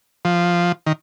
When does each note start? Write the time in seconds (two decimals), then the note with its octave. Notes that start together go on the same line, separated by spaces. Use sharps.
0.25 F3
0.86 D#3